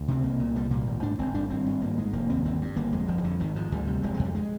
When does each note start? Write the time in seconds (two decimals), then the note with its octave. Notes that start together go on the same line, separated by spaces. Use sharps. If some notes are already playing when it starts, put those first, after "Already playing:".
Already playing: D2
0.08 C3 C4
0.24 C2 A#3
0.39 A#2
0.56 C2 G3
0.71 A#2 A#3
0.87 G#1
1.03 G#2 D4
1.19 G1 C4
1.34 G2 D4
1.50 G#1 C4
1.66 G2
1.82 G#1 A#3
1.98 G#2 G#3
2.13 F1 A#3
2.30 D#2 C4
2.45 G1 C4
2.61 G2
2.76 G1 A#3
2.93 F2 G#3
3.08 G1 F3
3.18 D#3
3.24 F2 D3
3.40 G#1 D#3
3.56 G#2 F3
3.72 D2 G3
3.87 C3
4.03 F1 G#3
4.14 G#3
4.19 F2
4.25 G3
4.35 G#3